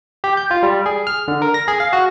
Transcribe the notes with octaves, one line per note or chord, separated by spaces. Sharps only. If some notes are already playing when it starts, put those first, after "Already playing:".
G4
G6
F4
G3
G#4
F6
D3
A#4
A#6
G#4
F5
F#4